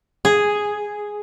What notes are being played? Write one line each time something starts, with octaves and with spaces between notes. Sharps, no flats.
G#4